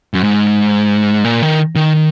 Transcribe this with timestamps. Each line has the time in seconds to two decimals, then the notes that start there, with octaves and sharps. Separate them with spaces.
0.14 F#2
0.24 G#2
1.24 A#2
1.42 D#3
1.76 D#3